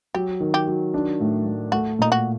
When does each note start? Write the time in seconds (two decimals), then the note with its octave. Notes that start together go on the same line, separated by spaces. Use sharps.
0.15 F#3 G4
0.40 D#3
0.54 G4
0.67 F#3
0.94 D4
1.20 A2
1.46 A2
1.72 A3 F#4
1.99 A#2 D#4
2.12 F#4